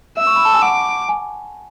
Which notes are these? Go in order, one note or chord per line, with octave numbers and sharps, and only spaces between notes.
E5 E6
C#6
B5
A5
G#5
F#5 D6
G#5